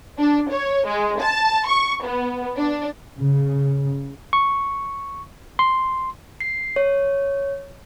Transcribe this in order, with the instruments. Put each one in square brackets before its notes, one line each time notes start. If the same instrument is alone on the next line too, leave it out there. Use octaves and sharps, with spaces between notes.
[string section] D4
C#5
G#3
A5
C#6
B3
D4
[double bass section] C#3
[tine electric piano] C#6
C6
[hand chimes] C7
C#5